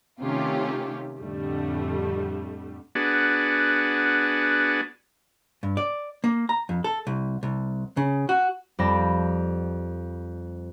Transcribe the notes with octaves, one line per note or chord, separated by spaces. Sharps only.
C3 D#3 A3 C#4 F4 G4
F2 A2 D3 G3 A3
B3 D4 F#4 G#4
G2
D5
A#3
A#5
F2
A4
C2
C2
C#3
F#4
F2 G3 G4 A5 B5 A#6